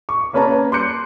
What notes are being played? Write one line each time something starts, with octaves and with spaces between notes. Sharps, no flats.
C#6
A#3 C#4 B4 C#5 A5 A#5
C6 D6 F#6 G6 C#7